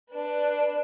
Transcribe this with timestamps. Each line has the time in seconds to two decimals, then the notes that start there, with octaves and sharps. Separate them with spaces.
0.11 D4 B4